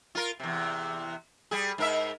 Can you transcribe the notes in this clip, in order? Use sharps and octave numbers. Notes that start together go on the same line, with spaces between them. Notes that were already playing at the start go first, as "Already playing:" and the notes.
F4 A#4
E2 C3
G3 G#4
G#2 A#4 E5